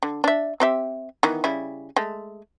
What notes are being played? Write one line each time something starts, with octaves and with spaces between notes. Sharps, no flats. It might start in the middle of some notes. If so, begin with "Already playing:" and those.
D3
D4 E5
C4 G4 E5
D#3 E3 B3
C#3 G3 E4
G#3 A3